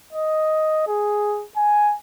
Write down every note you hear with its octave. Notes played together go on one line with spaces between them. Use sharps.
D#5
G#4
G#5